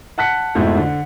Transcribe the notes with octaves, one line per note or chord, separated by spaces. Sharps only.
F#5 A5 F#6 B6 C#7
F2 G#2 B2 A3 E4
D3